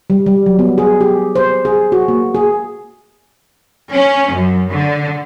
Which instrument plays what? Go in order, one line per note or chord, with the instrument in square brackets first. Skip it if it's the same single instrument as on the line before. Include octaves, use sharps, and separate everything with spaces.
[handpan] G3
G3
F#3
B3
G#4
G4
C5
G#4
F#4
A#3
G#4
[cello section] C#4
F#2
D3